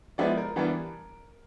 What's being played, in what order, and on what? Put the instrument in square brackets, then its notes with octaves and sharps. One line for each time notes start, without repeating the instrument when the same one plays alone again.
[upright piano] F3 G#3 B3 E4 D5
A#4
E3 G3 B3 D4